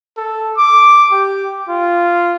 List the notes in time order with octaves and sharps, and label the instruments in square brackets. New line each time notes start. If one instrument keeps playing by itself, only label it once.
[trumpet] A4
D6
G4
F4